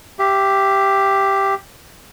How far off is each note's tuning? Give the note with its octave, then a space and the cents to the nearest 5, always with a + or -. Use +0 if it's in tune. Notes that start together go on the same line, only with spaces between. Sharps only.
G4 +0 E5 +35